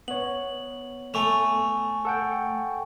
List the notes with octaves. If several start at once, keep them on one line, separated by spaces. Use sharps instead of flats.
B3 C#5 F#7
A3 G#5 C#6 F7
A4 F#5 G5